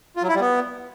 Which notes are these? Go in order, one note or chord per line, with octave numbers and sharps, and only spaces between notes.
F4
F#3
E4
G3
B3